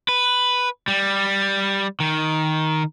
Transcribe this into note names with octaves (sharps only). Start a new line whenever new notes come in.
B4
G3
D#3